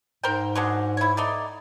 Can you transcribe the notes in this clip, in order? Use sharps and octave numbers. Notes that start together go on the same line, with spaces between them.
G#2 A#4 C5 G5
F#3 G#3 D4
E4 C#5
A3 D#4 D5